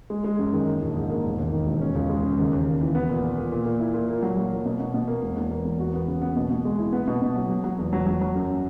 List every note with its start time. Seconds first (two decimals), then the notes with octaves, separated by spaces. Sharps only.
0.10 G#3
0.24 G#3
0.39 F#2
0.53 D#3
0.67 A#3
0.82 A#1
0.96 G#2
1.10 A#3
1.24 E1
1.39 D#2
1.53 D#3
1.67 E1
1.81 C#4
1.95 C#2
2.09 G#3
2.24 C#3
2.38 D#2
2.52 D#2
2.67 D#2
2.81 E3
2.95 B3
3.09 A#2
3.24 A#2
3.38 A#2
3.52 A#2
3.66 A#2
3.80 E4
3.94 A#2
4.08 A#3
4.22 F#3
4.37 F#3
4.51 A#3
4.66 B2
4.80 B2
4.94 B2
5.08 A#3
5.23 E1
5.36 E2
5.51 A#3
5.65 E2
5.79 F#4
5.94 B3
6.08 C#3
6.22 B3
6.36 B2
6.50 B2
6.65 G#3
6.79 E4
6.93 B3
7.07 B2
7.22 B2
7.36 F#3
7.50 F#3
7.64 F#3
7.79 E2
7.93 F#3
8.06 F#3
8.21 F#3
8.35 F#2